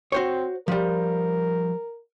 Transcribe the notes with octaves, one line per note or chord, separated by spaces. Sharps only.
C4 F#4 C5 C#5
F3 G3 A#4